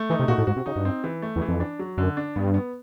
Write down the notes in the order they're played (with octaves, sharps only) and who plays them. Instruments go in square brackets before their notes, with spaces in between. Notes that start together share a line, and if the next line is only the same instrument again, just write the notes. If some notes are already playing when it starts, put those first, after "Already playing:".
Already playing: [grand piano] A3
[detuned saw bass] E3 [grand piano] D#4
[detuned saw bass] C3
[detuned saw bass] A#2 [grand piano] F#4
[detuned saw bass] A2
[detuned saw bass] G#2 [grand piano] F#4
[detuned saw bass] C3
[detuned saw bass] C#3 [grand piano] D#4
[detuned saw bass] G2
[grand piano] C4
E3
A3
[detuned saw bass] E2
[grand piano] E3
[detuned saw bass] F2
[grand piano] D4
F#3
[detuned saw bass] F#2 [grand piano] D3
[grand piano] D4
[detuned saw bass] G2 [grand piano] B3
[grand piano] B3